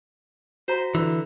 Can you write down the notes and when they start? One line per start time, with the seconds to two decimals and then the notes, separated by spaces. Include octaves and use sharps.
0.68 F#4 C5 A#5
0.95 D3 E3